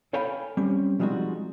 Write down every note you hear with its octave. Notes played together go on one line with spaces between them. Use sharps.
A4 C#5 F5 G5 G#5 B5
G3 C4 C#4
F3 G3 G#3 C4 D#4 F#4